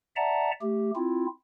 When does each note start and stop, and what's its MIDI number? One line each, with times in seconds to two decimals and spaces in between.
0.16 0.51 74
0.16 0.51 76
0.16 0.51 78
0.16 0.51 81
0.16 0.51 82
0.62 0.91 57
0.62 0.91 67
0.96 1.26 60
0.96 1.26 64
0.96 1.26 65